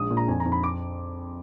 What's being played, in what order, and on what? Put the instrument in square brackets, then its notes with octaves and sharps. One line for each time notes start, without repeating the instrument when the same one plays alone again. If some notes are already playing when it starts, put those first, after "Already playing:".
Already playing: [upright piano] A#1 G#3 D#6
A#2
A#5
F2 G#5
A#5
F2
B5
D6